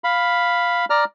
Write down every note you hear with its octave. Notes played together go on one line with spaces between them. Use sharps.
F5 B5
D5 A#5 F6